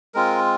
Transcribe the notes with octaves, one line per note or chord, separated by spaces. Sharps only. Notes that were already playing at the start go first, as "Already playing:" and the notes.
G#3 C4 F4 A#4